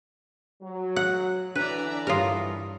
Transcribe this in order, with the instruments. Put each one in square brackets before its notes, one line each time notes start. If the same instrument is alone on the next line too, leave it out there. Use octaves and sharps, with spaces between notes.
[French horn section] F#3
[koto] F#5
[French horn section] D3 E3 [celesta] D4 F#6 [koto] B4 [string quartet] D5 E5 A#5
[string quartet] G2 [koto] F4 A#4 [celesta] G4 C#5 D#6